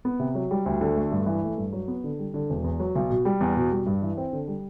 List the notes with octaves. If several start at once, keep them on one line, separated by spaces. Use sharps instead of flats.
B3
C3
F#3
G3
D2
D3
A3
G2
E3
A3
G2
F#3
B3
D3
G3
D3
E1
E2
F#3
B1
B2
G3
E2
B2
G3
G2
E3
C4
D3
G3